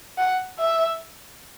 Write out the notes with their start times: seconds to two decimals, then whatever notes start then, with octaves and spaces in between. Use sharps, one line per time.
0.18 F#5
0.59 E5